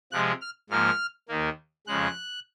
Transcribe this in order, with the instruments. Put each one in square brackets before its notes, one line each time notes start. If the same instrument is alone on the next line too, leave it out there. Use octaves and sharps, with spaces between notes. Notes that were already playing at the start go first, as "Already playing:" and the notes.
[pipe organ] C3 F3 G#3 F#6
F6
G#2 F3 A#3 F6
D#2 D#3 A#3
F2 C#3 G#3 F#6